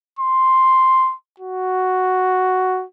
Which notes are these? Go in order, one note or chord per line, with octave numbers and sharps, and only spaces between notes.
C6
F#4